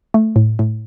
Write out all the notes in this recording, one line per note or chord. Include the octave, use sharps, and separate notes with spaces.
A3
A2
A2